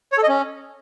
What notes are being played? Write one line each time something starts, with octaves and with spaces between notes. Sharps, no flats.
C#5
A4
D#5
C#4